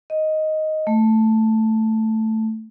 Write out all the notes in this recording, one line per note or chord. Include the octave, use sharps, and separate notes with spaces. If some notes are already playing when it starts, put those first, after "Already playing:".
D#5
A3